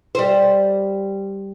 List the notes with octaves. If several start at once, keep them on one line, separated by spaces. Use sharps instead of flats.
G3 C5